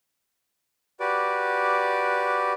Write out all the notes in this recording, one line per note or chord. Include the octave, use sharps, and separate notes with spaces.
F#4 G4 B4 D5